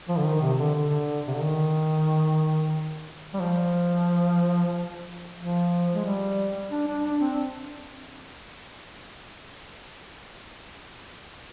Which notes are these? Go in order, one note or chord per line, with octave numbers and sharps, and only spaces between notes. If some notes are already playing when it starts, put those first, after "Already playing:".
F3
D3
D#3
C3
D3
D3
C3
D3
D#3
G3
F3
F3
G#3
G3
D4
D4
D4
C4